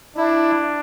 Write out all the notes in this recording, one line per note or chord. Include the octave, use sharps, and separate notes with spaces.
D4 E4